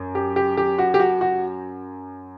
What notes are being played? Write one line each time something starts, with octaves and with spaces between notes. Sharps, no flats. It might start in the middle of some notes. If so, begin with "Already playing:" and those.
Already playing: F#2
G4
G4
G4
F#4
G4
F#4
F#4